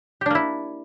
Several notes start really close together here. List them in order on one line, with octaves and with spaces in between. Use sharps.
G4 D4 A#3 E4